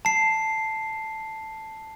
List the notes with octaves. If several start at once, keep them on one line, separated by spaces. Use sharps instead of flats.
A5 C7